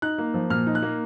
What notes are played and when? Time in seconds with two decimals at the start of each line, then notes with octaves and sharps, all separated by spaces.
0.02 D#4 F#6
0.18 A#3
0.34 F3
0.50 A#2 F6
0.67 D#4
0.75 F#6
0.83 A#3